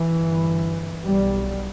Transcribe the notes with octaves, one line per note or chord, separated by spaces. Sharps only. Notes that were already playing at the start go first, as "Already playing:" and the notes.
Already playing: E3
G1 G2
B1 B2 G3